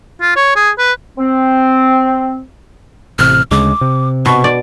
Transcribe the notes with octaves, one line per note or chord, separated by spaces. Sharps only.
F4
C#5
G#4
B4
C4
A1 C3 F6
D2 C#3 G#3 D6
C3
B2 C#6
D5